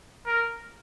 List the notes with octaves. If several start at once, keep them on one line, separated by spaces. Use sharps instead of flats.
A#4